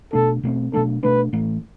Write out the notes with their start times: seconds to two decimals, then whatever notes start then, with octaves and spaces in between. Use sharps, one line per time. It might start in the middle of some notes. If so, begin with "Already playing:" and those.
0.13 B2 A3 D4 A4
0.43 B2 A3 C4
0.73 B2 F#3 A3 D4 A4
1.03 B2 A3 D4 B4
1.33 A2 E3 A3